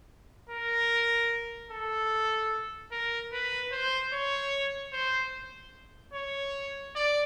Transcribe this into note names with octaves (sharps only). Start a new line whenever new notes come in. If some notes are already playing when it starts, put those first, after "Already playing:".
A#4
A4
A#4
B4
C5
C#5
C5
C#5
D5